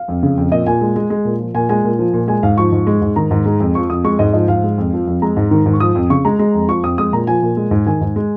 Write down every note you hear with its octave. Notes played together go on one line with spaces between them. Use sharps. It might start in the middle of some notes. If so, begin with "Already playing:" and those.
Already playing: F5
F2
C#3
F2
A#2 D#5
A#2 G#5
G#3
G#3
G#3
A#2
F3
A#2 G#5
G#3 G#5
A#2
F3
A#2
G#3 G#5
G#2 F5
F3 C#6
G#2
G#3
G#2
D#3 A#5
G#2
G#3
F2
F3 C#6
F2 D#6
G#3 C#6
G#2 D#5
F3 D#5
G#2 F5
G#3
F2
F3
F2
G#3 A#5
G#2
D#3
G#2
C#6
F3 D#6
F2
C#3 C#6
G#3 A#5
G#3
F2
F3 C#6
F2 D#6
G#3 D#6
A#2 A#5
F3 G#5
A#2
G#3
G#2
D#3 G#5
G#2
G#3